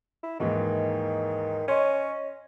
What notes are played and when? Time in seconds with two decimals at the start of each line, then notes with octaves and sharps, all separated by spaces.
0.23 E4
0.40 D#2 G#2 D#3 E3
1.68 C#4 C#5 D#5 C6